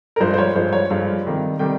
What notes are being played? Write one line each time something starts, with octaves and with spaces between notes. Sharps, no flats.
A#4
G2 F3 G#3 C5
C5
C#5
G2 F3 G#3 C5
C#5
G2 F3 G#3 F5
C3 D#3 G3
C3 D#3 G3 G5